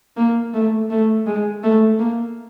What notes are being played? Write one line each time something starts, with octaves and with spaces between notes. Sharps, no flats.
A#3
A3
A3
G#3
A3
A#3